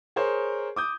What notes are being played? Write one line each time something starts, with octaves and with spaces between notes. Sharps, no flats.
G#4 A#4 C5 C#5
D6 D#6 G6